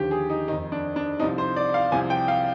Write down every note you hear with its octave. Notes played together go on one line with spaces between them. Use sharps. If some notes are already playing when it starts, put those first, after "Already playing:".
Already playing: D#2 D3 F3 G4
G#4
D#4
F2 D#3 D#4
D4
D4
C2 C3 F3 D#4
C5
D5
F5
C2 C3 F3 G#5
G5
F5